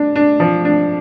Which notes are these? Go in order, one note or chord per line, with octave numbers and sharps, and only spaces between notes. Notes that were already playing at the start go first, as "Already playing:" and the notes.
Already playing: D4
D4
F3
D4